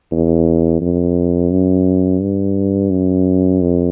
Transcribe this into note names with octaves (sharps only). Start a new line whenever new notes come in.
E2
F2
F#2
G2
F#2
F2